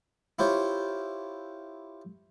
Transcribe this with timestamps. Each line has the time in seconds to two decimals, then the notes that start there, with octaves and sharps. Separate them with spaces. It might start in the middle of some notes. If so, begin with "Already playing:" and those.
0.39 E4 F4 G4 C5 C#5